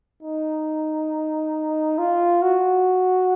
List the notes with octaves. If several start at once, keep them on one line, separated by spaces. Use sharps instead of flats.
D#4
F4
F#4